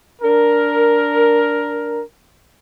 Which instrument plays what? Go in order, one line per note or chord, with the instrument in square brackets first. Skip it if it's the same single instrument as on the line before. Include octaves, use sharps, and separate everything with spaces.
[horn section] D4 A#4